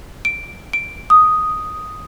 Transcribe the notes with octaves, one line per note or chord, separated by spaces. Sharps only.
D7
D7
D#6